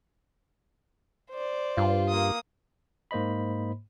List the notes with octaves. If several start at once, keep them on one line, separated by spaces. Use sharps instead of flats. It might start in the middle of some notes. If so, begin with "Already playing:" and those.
C5 D5
G2 F4
A#3 D#6
G#2 A#3 C5 D#5 B5